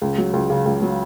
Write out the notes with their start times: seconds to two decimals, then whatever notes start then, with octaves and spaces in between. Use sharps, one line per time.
0.01 C#2
0.18 F#3
0.33 C#2
0.50 C#3
0.66 C#2
0.82 F#3